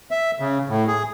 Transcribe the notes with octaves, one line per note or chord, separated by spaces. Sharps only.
E5
C#3
A2
G#4